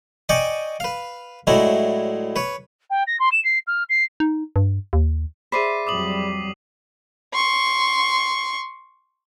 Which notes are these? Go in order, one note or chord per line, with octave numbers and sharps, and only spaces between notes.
D5 D#5 G5 G#5 C#6 D6
B4 F5
A2 F#3 G#3 D4 E4 A#5
B4 C#5
G5
A#6
C6
E7
C7
F6
C7
D#4
G2
D#2
G#4 C5 D5 E5 B5 B6 C7 D#7
F2 F#3 G3 D6 D#6 F#7
C6 C#6